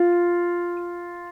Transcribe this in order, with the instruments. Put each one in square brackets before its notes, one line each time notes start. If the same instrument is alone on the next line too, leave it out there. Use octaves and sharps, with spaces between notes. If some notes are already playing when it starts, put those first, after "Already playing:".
Already playing: [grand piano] F4